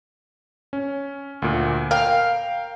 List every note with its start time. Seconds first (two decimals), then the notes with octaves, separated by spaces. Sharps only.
0.73 C#4
1.42 D2 A#2
1.91 A#4 F5 G5